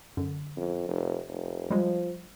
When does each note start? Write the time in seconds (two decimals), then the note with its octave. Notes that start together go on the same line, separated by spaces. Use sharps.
0.17 F#2 D3
0.57 F2
0.88 F1
1.28 F1
1.70 F3 G3 G#3